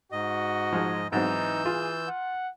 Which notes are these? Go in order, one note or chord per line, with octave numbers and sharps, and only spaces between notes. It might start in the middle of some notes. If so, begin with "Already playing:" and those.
G#2 F#4 D#5
F3 G#3 D#4
G#2 E3 F#3 C4 D#4 E6 G6
F4 G#4
F#5